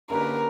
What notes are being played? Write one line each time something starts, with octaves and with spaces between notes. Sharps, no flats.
D3 A#3 C#4 G4 A#4 B4